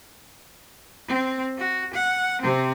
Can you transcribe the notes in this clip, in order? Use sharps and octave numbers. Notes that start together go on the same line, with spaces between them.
C4
F#4
F#5
C3 C4